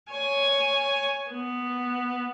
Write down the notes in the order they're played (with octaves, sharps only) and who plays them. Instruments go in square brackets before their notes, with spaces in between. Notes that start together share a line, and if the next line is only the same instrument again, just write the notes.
[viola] C#5 G#5
B3